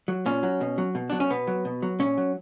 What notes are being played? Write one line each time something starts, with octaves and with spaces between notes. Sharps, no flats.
F#3
A#2 C#4
F#3
B2
F#3
B2
F#3 D4
C#4
B2 B3
F#3
B2
F#3
A#2 C#4
F#3